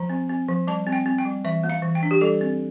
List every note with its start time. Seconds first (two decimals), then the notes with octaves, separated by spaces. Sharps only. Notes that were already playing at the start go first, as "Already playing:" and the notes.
Already playing: F3 A#5
0.10 C4
0.29 C4
0.48 F3
0.67 G3 A5
0.86 C4
0.93 G5
1.06 C4
1.18 G5
1.25 G3
1.45 E3 E5
1.64 A#3
1.69 F5
1.82 E3
1.95 G5
2.03 D4
2.11 G4
2.21 G3 A4
2.41 C4